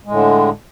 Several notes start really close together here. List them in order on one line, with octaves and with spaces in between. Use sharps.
G#3 A2 D3